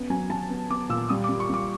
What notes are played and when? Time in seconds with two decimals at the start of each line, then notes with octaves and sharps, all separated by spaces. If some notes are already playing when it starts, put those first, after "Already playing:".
Already playing: B3 C#4
0.10 F#3 G#5
0.30 F#3 A5
0.49 B3
0.70 B3 D6
0.89 A#2 E6
1.09 G3 D#6
1.24 D6
1.29 G3
1.40 C#6
1.50 G3 D6